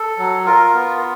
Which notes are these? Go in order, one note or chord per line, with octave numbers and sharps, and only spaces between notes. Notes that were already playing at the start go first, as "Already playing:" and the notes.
Already playing: A4
F#3
F4 A#4
B3